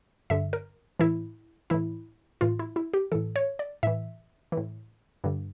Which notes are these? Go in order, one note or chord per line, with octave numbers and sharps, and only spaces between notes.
G2 D3 E5
A#4
A2 E3 E4
A2 E3 E4
A2 E3 F4
E4
E4
G4
A2 E3 A4
C#5
D5
A2 E3 E5
A2 E3
G2 D3